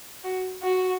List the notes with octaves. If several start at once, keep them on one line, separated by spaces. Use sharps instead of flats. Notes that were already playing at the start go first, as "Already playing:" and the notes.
F#4
F#4